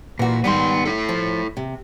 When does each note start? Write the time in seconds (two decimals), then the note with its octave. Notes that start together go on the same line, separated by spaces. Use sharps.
0.19 A#2 E3 F#4
0.44 G#2 D#3 G3 B3 C6
0.85 E4 A4
1.09 F3
1.57 C3